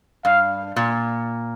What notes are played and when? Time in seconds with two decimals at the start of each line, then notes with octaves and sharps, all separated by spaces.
0.24 G2 F5
0.76 A#2